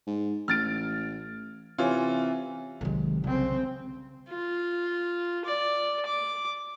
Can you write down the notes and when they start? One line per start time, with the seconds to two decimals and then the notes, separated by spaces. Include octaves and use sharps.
0.07 G#2
0.48 A1 F6 A6 D7
1.78 C3 E3 C#4 F4
2.81 B1 C3 D#3 F#3 G#3
3.24 C#3 G3 C4
4.30 F4
5.45 D5
6.06 D6